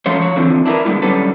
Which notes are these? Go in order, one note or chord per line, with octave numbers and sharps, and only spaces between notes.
F3 A3 C#4 C5 C#5
F3 C#5
D3 E3 F3 C4
D4 E4 G4 A#4 B4
D3 G3 G#3 B3 E4
D3 F#3 G3 C#4 A4 B4